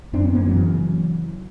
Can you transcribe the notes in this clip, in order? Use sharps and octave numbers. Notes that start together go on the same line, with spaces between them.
F#2 C4 D4
B3 C#4
F#2 A#3 C4
E3 F#3
C#3